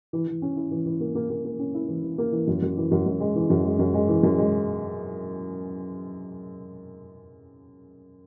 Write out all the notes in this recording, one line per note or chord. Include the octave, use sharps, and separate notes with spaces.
E3
E3
C#4
E4
E3
E3
A#3
A#3
A#3
A#3
C#4
E4
E3
E3
A#3
E3
F#2
F#2
E3
F#2
F#2
G#3
E3
F#2
G#3
F#2
G#3
E3
F#2
G#3